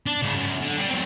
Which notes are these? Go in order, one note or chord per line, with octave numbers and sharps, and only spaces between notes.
D4
G#2 C#3
F#2
D3
G3 D5
F#3 C4